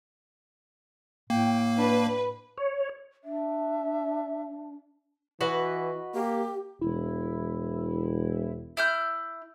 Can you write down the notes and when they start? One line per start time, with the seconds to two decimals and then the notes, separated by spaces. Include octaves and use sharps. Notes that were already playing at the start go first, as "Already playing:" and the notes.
1.30 A2 A#3 G5
1.78 D4 B4
2.58 C#5
3.24 D4 E5
5.41 E3 F#4 B4 D#5
6.15 A#3 G4
6.81 E1 E4
8.77 E4 F6 G6